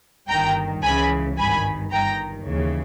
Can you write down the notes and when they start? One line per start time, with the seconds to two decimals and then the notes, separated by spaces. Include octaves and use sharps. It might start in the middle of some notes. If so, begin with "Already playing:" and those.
0.29 G1 G2 D#3 G5 A#5
0.83 C#2 C#3 E3 G#5 B5
1.38 G#1 G2 D#3 G#5 B5
1.92 G1 G2 D#3 G5 A#5
2.46 D#2 C#3 E3